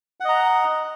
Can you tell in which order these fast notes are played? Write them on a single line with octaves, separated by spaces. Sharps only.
F#5 D#5 A#5